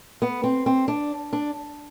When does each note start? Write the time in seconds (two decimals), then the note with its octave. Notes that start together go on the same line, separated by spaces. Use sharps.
0.22 B3
0.44 C4
0.66 C4
0.88 D4
1.33 D4